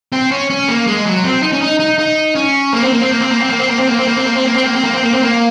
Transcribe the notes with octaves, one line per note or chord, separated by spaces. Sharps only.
C4
C#4
C#4
A#3
G#3
F#3
C4
D#4
C#4
D#4
D#4
D#4
C#4
A#3
C4
A#3
C4
A#3
C4
A#3
C4
A#3
C4
A#3
C4
A#3
C4
A#3
C4
A#3
C4
A#3
C4
A#3
C4
A#3
C4
A#3
C4
A#3